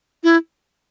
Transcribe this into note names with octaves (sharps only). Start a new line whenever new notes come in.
E4